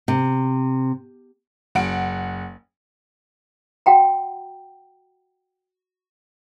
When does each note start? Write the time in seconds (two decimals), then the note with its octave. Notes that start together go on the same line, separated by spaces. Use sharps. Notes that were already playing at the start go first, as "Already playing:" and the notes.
0.08 C3
1.75 F#1 F#5 D7
3.86 F#4 F#5 G5 A#5